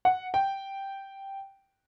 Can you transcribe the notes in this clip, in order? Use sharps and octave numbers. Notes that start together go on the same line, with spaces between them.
F#5
G5